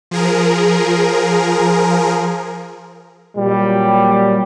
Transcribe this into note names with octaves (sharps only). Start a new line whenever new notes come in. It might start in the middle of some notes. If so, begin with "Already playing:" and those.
F3 G#4 A#4
A#2 F#3 G3